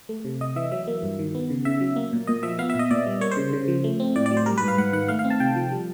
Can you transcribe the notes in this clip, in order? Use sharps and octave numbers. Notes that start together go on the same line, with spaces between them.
A3
C3
C3 D#5
E3 E5
F#3 E5
A#3
G2
D#3
B3
C#3
C#3 E5
F#3
A#3
A#2
A#2 D#5
F3 E5
B3 F5
E5
A#2 D#5
A#2 D5
G3
A#3 C#5
C5
C#3
C#3
F3
A3
C4
A2 D5
D5
F#3
C5
G3 A#4
B4
G#2
F5
G#2 F#5
D#3 F#5
A3 F5
F5
C4
A5
C3 G5
F3
G3